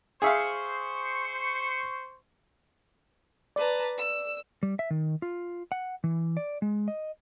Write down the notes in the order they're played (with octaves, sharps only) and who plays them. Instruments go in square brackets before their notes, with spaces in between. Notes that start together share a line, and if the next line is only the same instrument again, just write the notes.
[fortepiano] G#4 E5 F5 [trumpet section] C5 C#6
[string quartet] B4 A5 A#5 [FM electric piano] D5
[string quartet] E6
[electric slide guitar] G3
E5
D#3
F4
F#5
E3
D5
G#3
D#5